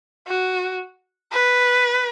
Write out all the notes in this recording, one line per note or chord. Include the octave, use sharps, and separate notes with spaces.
F#4
B4